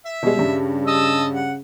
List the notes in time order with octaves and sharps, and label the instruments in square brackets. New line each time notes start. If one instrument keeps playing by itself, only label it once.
[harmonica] E5
[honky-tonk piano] B2 G3 G#3
[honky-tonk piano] G2 G3 [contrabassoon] C#3
[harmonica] D#5 A5 E6
F#5